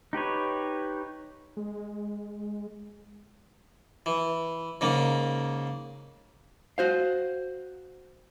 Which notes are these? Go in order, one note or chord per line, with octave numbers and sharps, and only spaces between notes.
D#4 G4 B4 C#5
G#3
E3
G#2 C#3 A#3
F#4 C5 F5